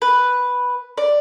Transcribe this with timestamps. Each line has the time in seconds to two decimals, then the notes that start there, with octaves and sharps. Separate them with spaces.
0.02 B4
0.98 D5